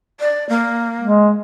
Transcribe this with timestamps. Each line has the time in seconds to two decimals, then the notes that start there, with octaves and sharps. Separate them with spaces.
0.20 D5
0.49 A#3
1.01 G#3